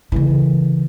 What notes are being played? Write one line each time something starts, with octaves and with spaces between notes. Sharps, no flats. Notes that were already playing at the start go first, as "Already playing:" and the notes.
C#3 E3